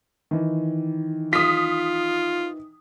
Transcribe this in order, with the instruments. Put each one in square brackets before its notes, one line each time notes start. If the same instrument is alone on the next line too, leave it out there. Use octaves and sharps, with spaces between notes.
[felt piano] D#3 E3
[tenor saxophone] F4 [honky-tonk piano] D#6 B6